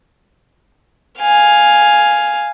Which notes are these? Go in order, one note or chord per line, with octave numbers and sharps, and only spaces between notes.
F5 G#5